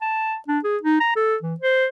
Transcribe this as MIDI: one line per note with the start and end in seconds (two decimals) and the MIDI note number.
0.01 0.36 81
0.48 0.59 62
0.64 0.77 68
0.83 1.00 63
1.00 1.16 82
1.16 1.36 69
1.42 1.55 52
1.60 1.86 72